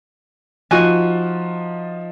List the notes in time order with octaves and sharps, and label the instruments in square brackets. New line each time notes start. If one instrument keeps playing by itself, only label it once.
[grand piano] F3 D#4 F4 [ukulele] F#4 G#5